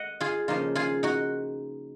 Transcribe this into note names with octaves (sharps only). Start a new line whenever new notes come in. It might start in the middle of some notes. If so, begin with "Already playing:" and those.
Already playing: D#5 F#5
F4 G#4
C#3 F3 A#3 D#4 F4
F4 G#4
D#4 F#4